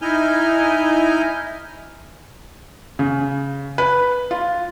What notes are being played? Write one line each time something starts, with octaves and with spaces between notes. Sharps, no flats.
D#4 E4 G#5 F6 G6
C#3
B4
F4